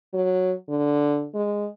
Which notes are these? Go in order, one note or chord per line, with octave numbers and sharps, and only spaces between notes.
F#3
D3
G#3